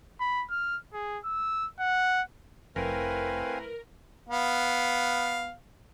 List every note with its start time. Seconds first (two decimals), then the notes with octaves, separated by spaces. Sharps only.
0.20 B5
0.51 F6
0.94 G#4
1.24 E6
1.80 F#5
2.76 F1 A3 C4 E4 A#4 B4 F5 G#5
4.29 B3 F5